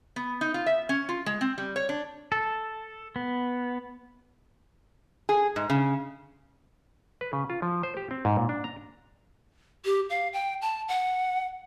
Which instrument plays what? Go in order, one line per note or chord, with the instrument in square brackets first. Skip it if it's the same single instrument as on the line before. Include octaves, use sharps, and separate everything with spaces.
[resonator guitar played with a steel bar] B3
D#4
F4
E5
C#4
F4
G#3
C4
G3
C#5
D4
[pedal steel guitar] A4
B3
[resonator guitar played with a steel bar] G#4
G#2
C#3
[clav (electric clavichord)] B4
C#3
F4
F3
C5
G4
C4
G#2
A#2
D4
A#5
[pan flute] G4
F5
G5
A5
F#5